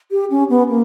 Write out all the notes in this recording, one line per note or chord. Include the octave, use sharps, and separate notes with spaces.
G4
C#4
B3
A#3